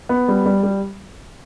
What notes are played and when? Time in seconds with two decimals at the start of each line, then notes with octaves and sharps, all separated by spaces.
0.09 B3
0.28 G3
0.46 G3
0.63 G3